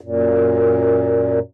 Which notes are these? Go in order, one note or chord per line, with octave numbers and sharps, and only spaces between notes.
F#2 A#2